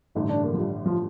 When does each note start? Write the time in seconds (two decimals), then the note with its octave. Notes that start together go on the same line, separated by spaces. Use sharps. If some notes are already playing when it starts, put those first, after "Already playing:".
0.15 A1 G2 D3 A3 D#4
0.29 D4
0.44 A#3
0.53 F3
0.57 G3
0.86 F3